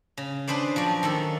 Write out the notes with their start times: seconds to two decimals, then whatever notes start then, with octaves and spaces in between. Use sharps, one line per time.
0.17 C#3
0.47 D4 G#4 B4 C5 D5
0.76 F3 F#3 D5
1.03 D#3 A#3 A4